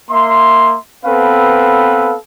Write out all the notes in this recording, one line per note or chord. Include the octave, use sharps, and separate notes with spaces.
A#3 E5 C6
B3 C4 A4 B4 F5